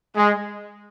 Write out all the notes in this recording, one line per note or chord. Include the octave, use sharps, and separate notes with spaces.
G#3